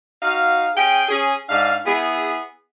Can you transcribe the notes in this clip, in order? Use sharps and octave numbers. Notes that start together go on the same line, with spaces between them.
D#4 F#4 F5
C#4 G#4 G5
C#4 G#4
G#2 D4 F5
B3 E4 G#4